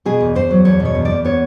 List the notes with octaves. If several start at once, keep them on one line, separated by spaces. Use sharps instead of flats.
B2 G#4
E2
E2 C5
F#3
E2 C#5
B2
C#5
E2
D5
E2
B3 C#5